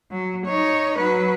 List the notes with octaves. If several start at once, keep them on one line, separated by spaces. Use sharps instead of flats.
F#3
D#4 C#5
F#3 B4